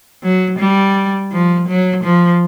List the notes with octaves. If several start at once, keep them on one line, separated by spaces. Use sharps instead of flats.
F#3
G3
F3
F#3
F3